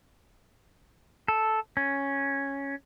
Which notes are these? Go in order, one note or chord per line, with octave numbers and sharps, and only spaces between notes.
A4
C#4